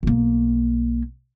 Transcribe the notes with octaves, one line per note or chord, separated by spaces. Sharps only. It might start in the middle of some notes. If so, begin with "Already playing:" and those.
B1 A#3